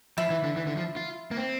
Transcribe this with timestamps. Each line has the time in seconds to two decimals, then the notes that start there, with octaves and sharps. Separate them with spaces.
0.18 F3 E4
0.30 E3
0.44 D3
0.56 E3
0.67 D3
0.77 F3
0.96 F4
1.31 A#3
1.36 C4